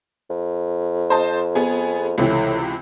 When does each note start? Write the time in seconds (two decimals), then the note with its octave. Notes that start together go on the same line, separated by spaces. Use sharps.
0.30 F2
1.10 C5 D#5 A5
1.55 B3 G#4
2.18 C#2 A2 C3 E3